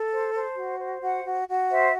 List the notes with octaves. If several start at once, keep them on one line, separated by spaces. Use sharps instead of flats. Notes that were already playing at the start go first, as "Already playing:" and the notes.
Already playing: A4
C5
C5 A5
F#4
C5
F#4 F#5
F#4
F#4
C5 E5